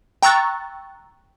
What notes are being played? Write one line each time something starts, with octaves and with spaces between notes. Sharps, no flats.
G5 A#5 C#6 E6 F#6 A6